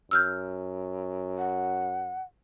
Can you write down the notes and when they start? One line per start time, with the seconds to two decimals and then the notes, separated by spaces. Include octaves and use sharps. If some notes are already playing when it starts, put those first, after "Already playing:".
0.11 F#2 E6 F6 G6
1.38 F#5